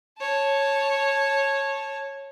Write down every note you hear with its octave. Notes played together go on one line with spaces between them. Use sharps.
C#5 A5